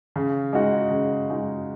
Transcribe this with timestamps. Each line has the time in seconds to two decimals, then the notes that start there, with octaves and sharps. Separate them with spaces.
0.16 C#3
0.53 G#3 D#4 F#4
0.91 C#3
1.30 G#3 D#4 F#4